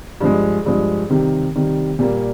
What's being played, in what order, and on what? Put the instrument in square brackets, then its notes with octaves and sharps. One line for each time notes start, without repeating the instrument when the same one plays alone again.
[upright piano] G2 F3 G#3
G2 F3 G#3
C3 D#3 G3
C3 D#3 G3
A#2 G3 A#3